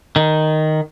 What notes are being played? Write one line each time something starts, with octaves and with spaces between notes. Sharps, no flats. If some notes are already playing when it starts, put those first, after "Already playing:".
D#3